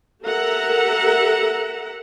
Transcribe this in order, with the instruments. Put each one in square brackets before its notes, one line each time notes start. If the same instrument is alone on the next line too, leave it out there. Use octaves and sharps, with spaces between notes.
[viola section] G4 A4 A#4 E5 F#5 A#5